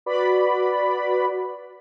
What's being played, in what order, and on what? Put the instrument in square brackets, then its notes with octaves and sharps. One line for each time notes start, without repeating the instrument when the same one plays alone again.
[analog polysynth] F#4 B4 D5 B5